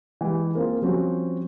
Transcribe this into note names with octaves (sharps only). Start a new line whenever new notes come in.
E3 G#3 G4
A#3 C4 F4 G#4
F3 G3 C4 C#4 F#4